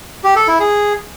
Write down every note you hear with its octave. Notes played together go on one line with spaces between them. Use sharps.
G4
A4
E4
G#4